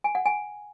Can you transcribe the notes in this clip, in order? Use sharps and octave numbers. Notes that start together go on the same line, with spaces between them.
G#5
F#5
G#5